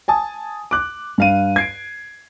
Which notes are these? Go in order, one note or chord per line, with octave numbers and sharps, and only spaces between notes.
G#5 A5 D#6
D6 F#6
G2 F5 D#7
G#6 C7 D7